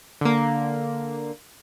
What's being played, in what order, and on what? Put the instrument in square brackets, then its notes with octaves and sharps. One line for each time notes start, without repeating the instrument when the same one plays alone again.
[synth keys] D3 A#3